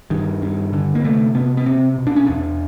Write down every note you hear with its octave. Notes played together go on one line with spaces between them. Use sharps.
G2 D#3
G2
D3
A#3
C3 A3
C3 B3
B3
C3 C4
B2
D4
C#4
E2 D4